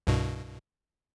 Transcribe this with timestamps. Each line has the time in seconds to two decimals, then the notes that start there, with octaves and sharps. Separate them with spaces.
0.07 C2 G2 B2